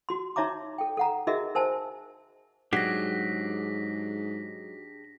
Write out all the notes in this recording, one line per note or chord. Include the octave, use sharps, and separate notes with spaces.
F#4 C6
D#4 C#5 E5 A#5 D6
A4 G5
A4 F#5 A#5
D#4 F#4 G#4 A#4 D#5 E5
A#4 C5 G#5 A5
G#2 F#3 D4 G4 G#4 A#6 B6